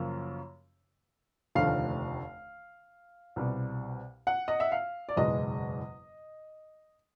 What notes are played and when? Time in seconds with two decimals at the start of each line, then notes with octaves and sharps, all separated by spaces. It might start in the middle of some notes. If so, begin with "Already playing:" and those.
Already playing: F#2 C#3 F3 A#3
1.55 F1 D#2 D3 F3 A3 F5
3.36 C2 B2 G3 C4
4.27 F#5
4.48 D#5
4.60 E5
4.72 F5
5.09 D5
5.16 F#1 E2 B2 G#3 D#5